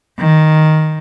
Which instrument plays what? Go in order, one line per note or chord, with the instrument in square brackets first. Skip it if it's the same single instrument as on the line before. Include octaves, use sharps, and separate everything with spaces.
[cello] D#3